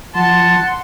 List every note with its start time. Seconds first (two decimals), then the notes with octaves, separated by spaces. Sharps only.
0.15 F3 F#5 A5 C6